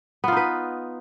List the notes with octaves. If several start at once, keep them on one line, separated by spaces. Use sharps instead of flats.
B3 D#4 F4 B4